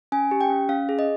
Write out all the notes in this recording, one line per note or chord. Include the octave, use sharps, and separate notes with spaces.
C#4 G#5
G4
G5
C#4
C#4 F5
G#4
D#5